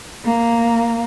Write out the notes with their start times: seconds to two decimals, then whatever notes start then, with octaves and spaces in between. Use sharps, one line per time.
0.25 A#3